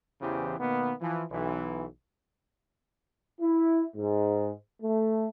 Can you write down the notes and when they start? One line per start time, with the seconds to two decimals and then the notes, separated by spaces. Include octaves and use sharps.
0.21 E2 C#3 E3 G4 G#4 C5
0.58 B2 D#3 A#3 B3
1.01 E3 F3
1.30 B1 E3
3.40 E4
3.96 G#2
4.82 A3